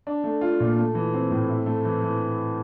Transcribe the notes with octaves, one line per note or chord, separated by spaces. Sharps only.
D4
A3
F4
A#2
A3
E3
C4
A2
E4
A3
E3
E3